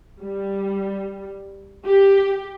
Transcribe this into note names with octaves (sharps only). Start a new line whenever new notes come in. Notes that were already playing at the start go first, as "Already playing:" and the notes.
G3
G4